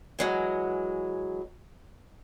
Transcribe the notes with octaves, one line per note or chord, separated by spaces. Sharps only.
E3 F#3 G#3